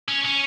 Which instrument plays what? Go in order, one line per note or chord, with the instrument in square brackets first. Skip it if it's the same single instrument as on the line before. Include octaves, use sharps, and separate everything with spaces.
[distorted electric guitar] C#4
C#4